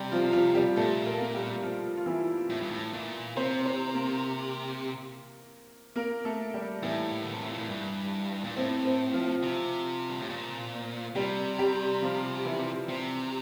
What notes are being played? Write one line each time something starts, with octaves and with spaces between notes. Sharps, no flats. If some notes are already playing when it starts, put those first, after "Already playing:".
Already playing: C3 G3 G4
F3 F4
F3 F4
G3 G4
A#2 A3 A4
A#4
A4
A#3 A#4
G3 G4
F3 F4
F4
E3 E4
A2
G2
A2
A#2
C3 C4 C5
C4 C5
A#3 A#4
A#3 A#4
A3 A4
G3 G4
A2 E3 E4
D3
C3
A#2
A2
G2
A#2
A2 C4
C4
F3 F4
C3
G2
A2
A#2
C3 G3 G4
G3 G4
F3 F4
E3 E4
C3 C4